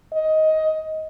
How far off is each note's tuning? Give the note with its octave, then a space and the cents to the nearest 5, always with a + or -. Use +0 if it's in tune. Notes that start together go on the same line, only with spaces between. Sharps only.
D#5 +15